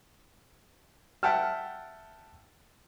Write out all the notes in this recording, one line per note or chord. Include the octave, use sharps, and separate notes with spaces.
E5 F#5 G5 A5 F6